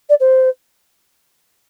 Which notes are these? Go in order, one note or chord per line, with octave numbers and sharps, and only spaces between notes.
D5
C5